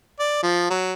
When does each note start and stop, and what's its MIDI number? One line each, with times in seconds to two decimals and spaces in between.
0.20 0.40 74
0.43 0.69 53
0.70 0.93 54